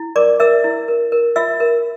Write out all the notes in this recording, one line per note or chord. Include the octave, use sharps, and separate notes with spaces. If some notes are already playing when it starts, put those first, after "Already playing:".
Already playing: E4
A#4 D5 D6
A#4 E5 E6
E4
A#4
A#4
F4 E5 E6
A#4